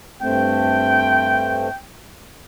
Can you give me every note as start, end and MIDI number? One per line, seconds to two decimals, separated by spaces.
0.22 1.69 43
0.22 1.69 57
0.22 1.69 60
0.22 1.78 79